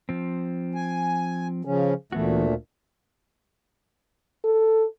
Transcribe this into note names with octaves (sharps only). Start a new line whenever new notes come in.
F3 C4
G#5
C#3 F3 C#4
D2 A#2 E3 A3 B3 F#4
A4